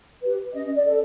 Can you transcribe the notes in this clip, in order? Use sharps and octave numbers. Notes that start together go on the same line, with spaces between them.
G4 B4
C#4 D#5
D5
A4